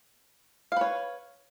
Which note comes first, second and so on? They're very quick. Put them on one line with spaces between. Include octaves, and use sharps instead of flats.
F5 B4 C#5